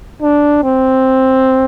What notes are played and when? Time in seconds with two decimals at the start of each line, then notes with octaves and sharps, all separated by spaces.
0.22 D4
0.64 C4